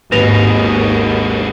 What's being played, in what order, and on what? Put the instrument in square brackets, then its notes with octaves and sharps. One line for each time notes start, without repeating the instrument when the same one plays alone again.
[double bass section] G#1 D#3 [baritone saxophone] D#2 [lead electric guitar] G#2 B2 [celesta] B4 A#6 F7